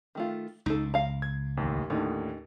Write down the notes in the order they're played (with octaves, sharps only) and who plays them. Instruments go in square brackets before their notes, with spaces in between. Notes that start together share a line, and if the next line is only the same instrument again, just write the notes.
[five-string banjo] D#3 A3 F4
[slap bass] C#2 [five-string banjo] D#4 A4
[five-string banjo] F5 A#5
[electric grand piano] G#6
A1 D#2
[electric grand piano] D#2 A2 D3 [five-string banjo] C#4 D#4